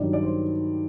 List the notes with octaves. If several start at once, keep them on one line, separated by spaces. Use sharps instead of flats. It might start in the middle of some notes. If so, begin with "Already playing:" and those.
Already playing: G2 D#3 F#3 D5
D5
C5